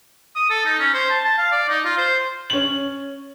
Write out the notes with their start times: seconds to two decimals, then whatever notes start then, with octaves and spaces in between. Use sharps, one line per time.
0.36 D#6
0.50 A4
0.66 D#4
0.80 C#4
0.94 C5
1.10 A5
1.25 A5
1.38 F5
1.52 D5
1.69 D#4
1.85 F4
1.98 C5
2.50 C#4 F#7